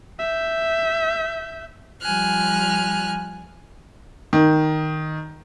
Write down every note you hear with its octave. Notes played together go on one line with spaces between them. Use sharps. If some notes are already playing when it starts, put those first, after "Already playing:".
E5 G6
F3 G3 G#5 F6 F#6
D#3